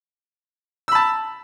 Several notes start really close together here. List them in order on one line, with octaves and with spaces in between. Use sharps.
E6 B5 A5